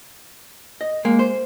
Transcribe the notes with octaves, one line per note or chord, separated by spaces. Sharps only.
D#5
G#3 A#3
C5